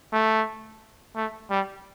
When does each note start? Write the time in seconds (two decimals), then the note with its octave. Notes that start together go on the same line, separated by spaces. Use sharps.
0.13 A3
1.16 A3
1.50 G3